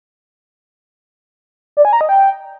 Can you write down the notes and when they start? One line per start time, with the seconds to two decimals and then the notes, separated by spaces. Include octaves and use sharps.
1.77 D5
1.85 G#5
1.93 A#5
2.01 D#5
2.09 G5